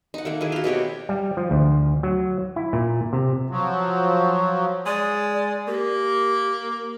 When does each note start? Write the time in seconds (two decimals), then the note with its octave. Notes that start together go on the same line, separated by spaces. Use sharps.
0.14 D#4 F#5
0.25 D#3 A3 A#3
0.41 D#3 E4 G#4
0.52 F4 F#4
0.64 B2 C4 G4 C#5
1.09 G3
1.37 F3
1.51 D2
2.03 F#3
2.56 E4
2.73 A#2
3.13 C3
3.49 F3 F#3
4.86 G#3 D5
5.68 A#3 G4